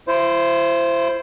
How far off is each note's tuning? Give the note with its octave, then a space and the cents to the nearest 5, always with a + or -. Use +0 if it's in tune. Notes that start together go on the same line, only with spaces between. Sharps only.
E4 +35 C5 +0